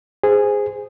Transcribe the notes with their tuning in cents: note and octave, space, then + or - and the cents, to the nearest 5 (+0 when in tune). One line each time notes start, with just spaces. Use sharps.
G#4 -10 C5 -15